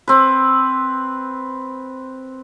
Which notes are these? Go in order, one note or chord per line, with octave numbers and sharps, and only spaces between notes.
C4 B4